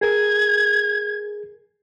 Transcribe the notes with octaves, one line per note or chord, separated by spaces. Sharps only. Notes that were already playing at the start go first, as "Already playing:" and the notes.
G#4 A#4 G#6